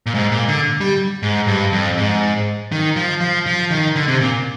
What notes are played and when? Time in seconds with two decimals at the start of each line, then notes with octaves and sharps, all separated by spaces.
0.06 A#2
0.14 G#2
0.32 A#2
0.48 D3
0.81 G3
1.23 G#2
1.47 G2
1.73 F2
1.97 G#2
2.72 D#3
2.96 F3
3.21 F3
3.46 F3
3.70 D#3
3.96 D3
4.08 C3
4.21 A#2